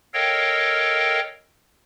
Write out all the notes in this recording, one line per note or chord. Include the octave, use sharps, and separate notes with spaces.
A4 A#4 C#5 D#5 F5 G5